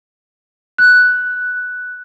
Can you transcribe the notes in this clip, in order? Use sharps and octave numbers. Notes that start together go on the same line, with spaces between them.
F#6